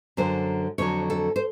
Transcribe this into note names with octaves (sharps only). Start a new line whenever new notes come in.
F#2 D3 F#3 C5
F2 D3 F#3 C#5
A4
C5